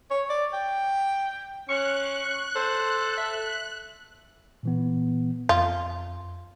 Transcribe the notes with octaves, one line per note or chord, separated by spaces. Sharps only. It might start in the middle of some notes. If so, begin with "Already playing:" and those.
C#5
D5
G5
C#4 C#6 F#6
A4 C5
E5
A#2 E3 B3
F2 F4